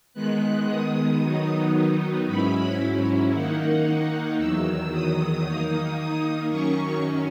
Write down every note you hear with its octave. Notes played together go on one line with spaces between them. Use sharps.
D#3 G#3 B3 F#6
D#6
D#3 F#3 B3 D#4
G#2 F#3 C#4 E4 B5
D#3 A#3 D#4 F#5
E2 D#3 F#3 E6
D#6
D#3 A#3 D#4
F#2 D#3 F#3 C#4 C#6